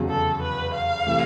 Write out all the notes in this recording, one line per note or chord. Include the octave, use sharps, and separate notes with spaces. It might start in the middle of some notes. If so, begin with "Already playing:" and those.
Already playing: F1 E2 C#3 F#3
A4
B4
F5
C3 E3 A3